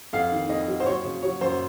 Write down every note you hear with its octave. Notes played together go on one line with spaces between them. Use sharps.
F2 F5
D#3
F2 D#5
F#3
C5
F#3 C#5
C#3
F#3 C#5
F#2 C5